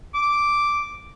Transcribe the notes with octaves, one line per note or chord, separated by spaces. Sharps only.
D6